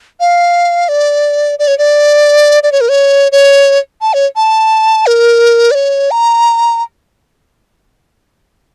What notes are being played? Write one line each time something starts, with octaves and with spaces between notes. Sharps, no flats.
F5
D5
D5
C#5
D5
D5
C#5
A#4
C#5
C#5
A5
C#5
A5
A#4
D5
C#5
A#5